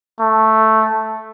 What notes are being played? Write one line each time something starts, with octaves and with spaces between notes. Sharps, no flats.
A3